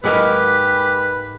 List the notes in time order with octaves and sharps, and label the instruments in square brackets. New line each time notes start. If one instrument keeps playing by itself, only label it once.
[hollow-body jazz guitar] G#2 G#3 A#3 [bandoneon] G4 [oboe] B4